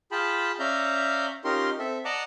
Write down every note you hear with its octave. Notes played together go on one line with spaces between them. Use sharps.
F4 G#4 G5 A5 B5
C#4 D5 E5 F5 A#5 G6
C#4 D#4 F4 G4 A#4 C6
C4 A4 E5
D5 D#5 F#5 A5 A#5 D6